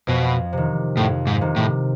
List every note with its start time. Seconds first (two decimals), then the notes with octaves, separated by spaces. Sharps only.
0.07 F2 B2
0.53 C3 D#3
0.97 F2 A2
1.27 G#2
1.41 C3 D#3
1.56 A2